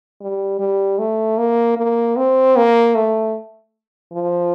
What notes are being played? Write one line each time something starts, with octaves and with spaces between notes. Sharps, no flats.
G3
G3
A3
A#3
A#3
C4
A#3
A3
F3